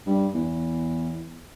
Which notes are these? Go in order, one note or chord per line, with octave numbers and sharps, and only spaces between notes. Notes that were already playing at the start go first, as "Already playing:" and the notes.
G2
E2